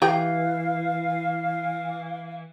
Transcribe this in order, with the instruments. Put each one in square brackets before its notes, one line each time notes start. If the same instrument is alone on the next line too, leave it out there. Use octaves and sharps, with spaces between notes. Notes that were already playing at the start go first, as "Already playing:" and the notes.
[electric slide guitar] E3 [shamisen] G4 G5 [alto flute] F5